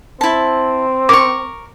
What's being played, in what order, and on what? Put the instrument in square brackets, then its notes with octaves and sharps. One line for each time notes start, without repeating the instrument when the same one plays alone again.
[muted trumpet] C4 [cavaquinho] E4 A5
[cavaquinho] A#4 C#6 [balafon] D6